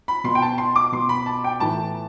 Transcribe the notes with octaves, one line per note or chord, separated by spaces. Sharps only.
B5
B2 C6
G5
A5
C6
D6
B2 C6
B5
A5
G5
A2 E3 A5